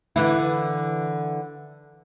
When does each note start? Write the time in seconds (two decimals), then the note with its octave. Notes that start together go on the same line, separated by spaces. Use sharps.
0.16 D3 E3 E4